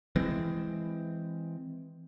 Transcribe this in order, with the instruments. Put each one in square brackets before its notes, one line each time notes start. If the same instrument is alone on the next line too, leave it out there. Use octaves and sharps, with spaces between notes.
[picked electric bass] E3 G#3 C4